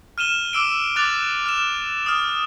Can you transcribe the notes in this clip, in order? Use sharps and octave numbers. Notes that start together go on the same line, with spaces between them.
F6 D#7 E7 G7
D6 E6 D7
D6 F#6 A6 F7
F6 E7
D#6 F6